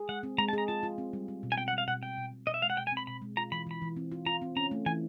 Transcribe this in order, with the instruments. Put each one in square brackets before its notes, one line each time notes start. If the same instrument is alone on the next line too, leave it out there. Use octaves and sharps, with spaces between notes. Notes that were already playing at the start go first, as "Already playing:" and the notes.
Already playing: [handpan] G#4
[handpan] G#3 [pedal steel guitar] F#5
[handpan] C4
[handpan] G#3 [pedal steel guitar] A#5
[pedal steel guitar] A5
[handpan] G#4 [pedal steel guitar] A#5
[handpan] F4 [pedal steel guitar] A5
[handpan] F4
C4
G3
C4
B2
[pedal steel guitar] G#5
[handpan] C4 [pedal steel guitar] G5
[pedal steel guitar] F#5
[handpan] G3 [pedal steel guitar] F5
[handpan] B2 [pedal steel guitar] F#5
[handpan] C4 [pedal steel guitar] G5
[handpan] B2
B2
[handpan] B2 [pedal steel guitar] D#5
[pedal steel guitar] E5
[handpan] G#3 [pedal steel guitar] F5
[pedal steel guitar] F#5
[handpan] B2 [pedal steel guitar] G5
[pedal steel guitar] G#5
[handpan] C4 [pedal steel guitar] B5
[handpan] B2 [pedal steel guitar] B5
[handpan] G#3
[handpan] F4 [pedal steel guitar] A#5
[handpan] E3 [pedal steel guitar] B5
[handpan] E3 [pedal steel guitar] B5
[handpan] E3
C4
F4
[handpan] F4 [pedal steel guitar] A#5
[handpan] C4
[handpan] C#4 [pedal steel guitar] A#5
[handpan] A3
[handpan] E3 [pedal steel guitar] G#5